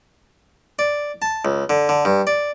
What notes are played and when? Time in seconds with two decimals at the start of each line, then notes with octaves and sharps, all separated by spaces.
0.79 D5
1.22 A5
1.45 C#2
1.70 D3
1.89 D3
2.05 G2
2.27 D5